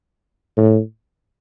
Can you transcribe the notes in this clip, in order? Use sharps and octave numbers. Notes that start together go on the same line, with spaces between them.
A2